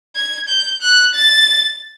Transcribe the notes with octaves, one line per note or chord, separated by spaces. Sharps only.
G#6
G6
F#6
A6